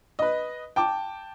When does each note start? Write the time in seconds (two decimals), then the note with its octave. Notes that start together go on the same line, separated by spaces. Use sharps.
0.19 B4 D#5
0.76 G5 A5 D6